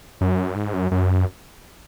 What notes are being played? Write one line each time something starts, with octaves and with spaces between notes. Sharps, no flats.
F#2
G#2
F#2
F#2